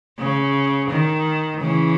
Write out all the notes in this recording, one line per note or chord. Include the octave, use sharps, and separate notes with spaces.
C#3
D#3
C#3 E3